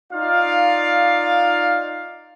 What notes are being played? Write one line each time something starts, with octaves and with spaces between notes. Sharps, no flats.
D#4 F4 D5 F5